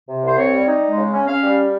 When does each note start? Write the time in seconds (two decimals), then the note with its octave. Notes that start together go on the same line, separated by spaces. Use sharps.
0.09 C3
0.23 C2 C5
0.38 C4 C#5
0.53 G3
0.67 D#4
0.82 G#3
0.98 C#3
1.13 C#4
1.27 C#4 F5
1.43 G3